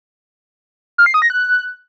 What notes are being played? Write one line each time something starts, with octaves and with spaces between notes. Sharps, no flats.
F6
C7
D#6
A#6
F#6